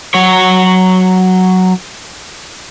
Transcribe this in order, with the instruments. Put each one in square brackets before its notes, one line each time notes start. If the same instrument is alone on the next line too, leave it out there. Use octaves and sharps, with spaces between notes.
[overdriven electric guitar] F#3 C#5